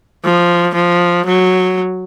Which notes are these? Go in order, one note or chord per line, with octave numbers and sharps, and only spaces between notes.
F3
F3
F#3